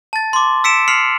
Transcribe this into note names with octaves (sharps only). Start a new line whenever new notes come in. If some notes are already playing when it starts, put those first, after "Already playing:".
A5 A6
C6 D6
E6 B6 C#7 D7 E7
F6 C7 C#7 F7 F#7